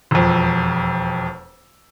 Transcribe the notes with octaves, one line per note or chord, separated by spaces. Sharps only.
E1 F2